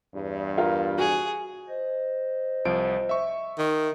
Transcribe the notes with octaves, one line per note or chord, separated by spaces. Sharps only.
E2 G2
F4 A#4
F#4 G#4
C5 D#5
C2 F3 D7
E5 C#6
D#3